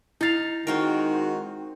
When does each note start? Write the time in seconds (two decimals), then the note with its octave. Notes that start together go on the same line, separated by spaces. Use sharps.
0.21 D#4 E4 F5 A6 F7
0.67 D#3 G#3 C4 D#4 F4 F#4 A#4